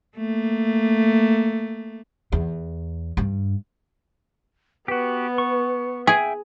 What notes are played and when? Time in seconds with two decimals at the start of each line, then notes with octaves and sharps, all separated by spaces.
0.16 A3 A#3
2.32 E2
3.17 G2
4.88 B3 F#4 G4 B4
5.38 C#6
6.07 G#4 E5 G5 G#5